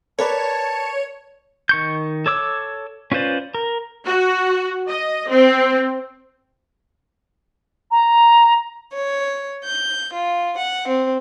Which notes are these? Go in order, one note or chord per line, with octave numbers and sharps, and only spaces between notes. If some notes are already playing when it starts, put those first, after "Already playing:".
A#4 B4 C#5 D5 A5
D#3 C#6 G6
A4 C#5 D6 E6
C#4 F4 B4 C5 D5
A#4
F#4
D#5
C4
A#5
C#5
G6
F4
F#5
C4